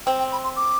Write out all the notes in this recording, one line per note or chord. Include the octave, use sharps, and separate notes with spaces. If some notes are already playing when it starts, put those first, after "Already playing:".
C4 G5
G5
B5
C6
D6